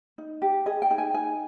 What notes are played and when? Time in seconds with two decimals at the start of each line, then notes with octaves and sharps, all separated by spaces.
0.18 D#4
0.42 G4
0.66 G#4 D#5
0.82 G5
0.91 D#4
0.98 G#5
1.14 D#4 G#5